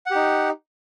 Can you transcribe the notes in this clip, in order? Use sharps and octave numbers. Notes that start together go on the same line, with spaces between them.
D#4 G4 F#5